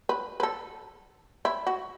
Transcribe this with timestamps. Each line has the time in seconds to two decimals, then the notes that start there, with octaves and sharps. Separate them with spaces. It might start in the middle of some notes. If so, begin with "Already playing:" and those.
0.09 B4
0.40 B4
0.43 A4
1.45 E4
1.67 F#4